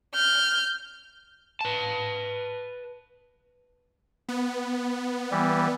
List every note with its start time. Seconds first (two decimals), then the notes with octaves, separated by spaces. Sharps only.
0.15 F6 G6
1.61 B4 A5
4.28 B3
5.31 E3 G3